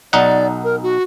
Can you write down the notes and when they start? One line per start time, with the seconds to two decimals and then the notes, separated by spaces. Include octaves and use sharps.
0.13 B1 D#4 D5 F#5
0.64 A#4
0.83 F#4